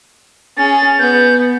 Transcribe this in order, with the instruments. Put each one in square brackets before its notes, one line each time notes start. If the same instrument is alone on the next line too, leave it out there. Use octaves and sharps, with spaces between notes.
[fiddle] C#4 G#4 [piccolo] A6
[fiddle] B3 [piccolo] G6